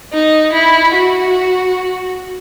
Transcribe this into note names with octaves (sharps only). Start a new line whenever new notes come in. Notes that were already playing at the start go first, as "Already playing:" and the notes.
D#4
E4
F#4